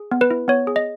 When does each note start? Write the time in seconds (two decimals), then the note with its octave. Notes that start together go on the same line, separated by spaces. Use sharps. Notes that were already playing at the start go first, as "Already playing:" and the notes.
Already playing: G#4
0.12 B3
0.21 B4
0.31 E4
0.48 B3 C#5
0.67 G#4
0.76 D#5